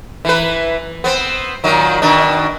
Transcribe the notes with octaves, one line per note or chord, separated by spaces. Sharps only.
E3 B4
B3 C4
A#2 D#3 F#3
B2 D#3 D4